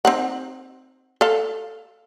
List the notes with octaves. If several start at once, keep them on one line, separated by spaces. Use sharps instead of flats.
C4 D#4 F#5
A4 F5